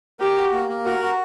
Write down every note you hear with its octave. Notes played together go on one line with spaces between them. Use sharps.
G4 A#4
F#4
A#3
A#3
F#4 A#4
F#4